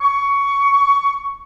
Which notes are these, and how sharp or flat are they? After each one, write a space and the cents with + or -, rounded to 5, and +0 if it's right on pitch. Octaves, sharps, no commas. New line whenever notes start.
C#6 +15